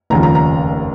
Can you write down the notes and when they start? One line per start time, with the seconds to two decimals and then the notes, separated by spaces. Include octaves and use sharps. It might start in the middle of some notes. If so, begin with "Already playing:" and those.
0.10 F1 D#2 C#3 F3 A#5
0.23 A#5
0.35 A#5